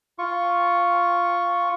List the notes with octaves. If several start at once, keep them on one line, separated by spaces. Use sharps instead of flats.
F4 C#6